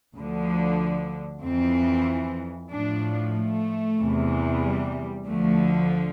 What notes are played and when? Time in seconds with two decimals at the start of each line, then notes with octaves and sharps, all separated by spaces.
0.15 D2 D3 F3
1.42 F2 E3 C4
2.70 A2 F3 D4
3.34 A3
3.98 E2 C3 E3
4.61 G3
5.25 D2 D3 F3 A3